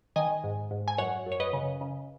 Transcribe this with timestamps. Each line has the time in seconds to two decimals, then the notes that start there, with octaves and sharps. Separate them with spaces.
0.16 D#3 D#5 G#5
0.44 G#2
0.71 G#2
0.88 G#5
0.98 F#2 C#5 F#5
1.26 F#2
1.32 C#5
1.40 B4 D#5
1.53 C#3
1.81 C#3